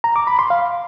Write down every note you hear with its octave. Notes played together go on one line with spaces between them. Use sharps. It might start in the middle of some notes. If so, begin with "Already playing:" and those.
A#5
D6
B5
C6
F5